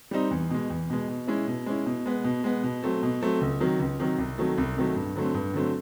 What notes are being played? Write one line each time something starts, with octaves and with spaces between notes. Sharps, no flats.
G3 C4 D#4
E2
B2 G#3
E2
B2 G#3
B2
G#3 C#4 E4
B2
G#3 C#4 E4
B2
G#3 B3
B2
G#3 B3
B2
F#3 A3 C4
B2
F#3 A3 C4
C#2
C3 D#3 F#3
C#2
C3 D#3 F#3
C2
C3 D#3 F#3 A3
C2
C3 D#3 F#3 A3
G2
D3 F#3 A3 C4
G2
D3 F#3 A3 C4